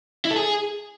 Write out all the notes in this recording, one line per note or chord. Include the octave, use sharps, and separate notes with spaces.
E4
A4
G#4